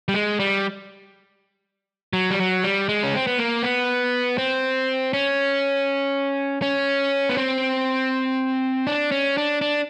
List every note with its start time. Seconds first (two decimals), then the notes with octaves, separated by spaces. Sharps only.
0.08 G3
0.14 G#3
0.40 G3
2.13 F#3
2.31 G3
2.39 F#3
2.64 G3
2.89 G#3
3.03 C#4
3.15 C4
3.27 B3
3.38 A#3
3.63 B3
4.38 C4
5.13 C#4
6.62 C#4
7.29 B3
7.37 C4
8.87 D4
9.11 C#4
9.37 D4
9.61 D4